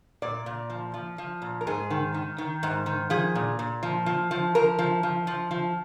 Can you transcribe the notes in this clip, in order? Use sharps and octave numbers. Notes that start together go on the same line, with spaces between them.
A#2 D5
A#2
F3
F3
F3
A#2
A#4
G#2 G#4
D#3
D#3
D#3
G#2
D#3
F3 G#4
A#2
A#2
F3
F3
F3
F3 A#4
F3
F3
F3
F3